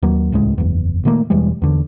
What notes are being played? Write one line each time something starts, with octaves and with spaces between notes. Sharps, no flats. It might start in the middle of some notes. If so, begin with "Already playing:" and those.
D#2 F#3 A#3
D#1 C#2 A2 G#3
F#1 E2
A#2 D#3 A3 A#3
E1 E3 G3 G#3
E2 D3